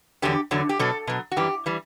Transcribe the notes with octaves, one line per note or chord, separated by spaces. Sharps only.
E2 D3 F#3 G4
E2 D3 F#3
G4
B2 F#3 A4
B2 F#3
F#4
F#2 E3 G3 G4
E3 G3